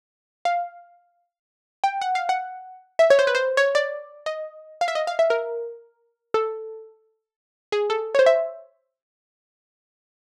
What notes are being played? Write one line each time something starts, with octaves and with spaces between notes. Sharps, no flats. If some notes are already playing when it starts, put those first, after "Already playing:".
F5
G5
F#5
F5
F#5
E5
C#5
C5
B4
C5
C#5
D5
D#5
F5
E5
D#5
F5
E5
A#4
A4
G#4
A4
C#5
C5
E5